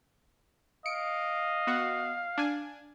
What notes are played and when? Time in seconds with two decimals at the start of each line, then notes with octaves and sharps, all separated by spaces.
0.86 D#5 F5 C#7 D7
1.67 B3 F#4 F#5
2.38 D4 G#5